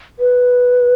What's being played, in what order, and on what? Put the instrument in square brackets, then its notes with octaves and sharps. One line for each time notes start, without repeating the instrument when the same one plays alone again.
[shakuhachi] B4